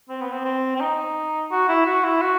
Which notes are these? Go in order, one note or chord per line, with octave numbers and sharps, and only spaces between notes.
C4
B3
C4
C4
C4
D#4
F#4
E4
F#4
E4
F#4